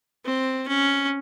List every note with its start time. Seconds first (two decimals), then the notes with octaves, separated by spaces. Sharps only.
0.25 C4
0.68 C#4